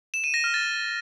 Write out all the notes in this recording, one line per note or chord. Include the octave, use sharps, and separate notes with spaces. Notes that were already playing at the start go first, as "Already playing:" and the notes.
E7
D#7
A#6
F6
A6